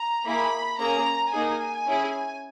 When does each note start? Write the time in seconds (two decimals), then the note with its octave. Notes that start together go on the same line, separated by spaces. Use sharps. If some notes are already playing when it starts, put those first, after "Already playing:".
Already playing: A#5
0.25 A#3 E4 G#4 B5
0.79 A#3 C#4 G#4 A#5
1.32 A#3 D#4 G#4 G#5
1.87 C#4 E4 G#4